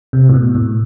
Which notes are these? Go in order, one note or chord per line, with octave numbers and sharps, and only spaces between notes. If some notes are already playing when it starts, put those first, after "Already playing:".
C3
A2
B2
A2